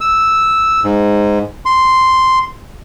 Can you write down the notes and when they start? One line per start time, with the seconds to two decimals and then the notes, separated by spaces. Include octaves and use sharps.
0.01 E6
0.84 G#2
1.66 C6